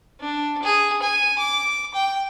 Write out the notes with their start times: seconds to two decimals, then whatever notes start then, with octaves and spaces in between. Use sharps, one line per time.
0.20 D4
0.63 G#4
1.03 G#5
1.39 D6
1.94 G5